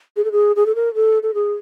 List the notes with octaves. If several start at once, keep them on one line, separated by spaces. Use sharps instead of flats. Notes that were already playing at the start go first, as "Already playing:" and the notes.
G#4
A4
G#4
G#4
A4
A#4
A4
A4
G#4